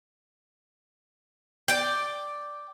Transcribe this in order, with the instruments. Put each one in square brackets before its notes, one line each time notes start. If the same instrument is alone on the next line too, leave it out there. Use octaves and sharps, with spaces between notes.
[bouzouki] D5 G5